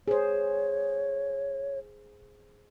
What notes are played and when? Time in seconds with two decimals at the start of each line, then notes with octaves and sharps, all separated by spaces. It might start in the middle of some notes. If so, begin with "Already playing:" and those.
0.08 G#4 C5 C#5